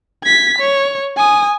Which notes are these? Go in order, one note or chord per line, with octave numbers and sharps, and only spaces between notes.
G#6 B6
C#5
G#5 D#6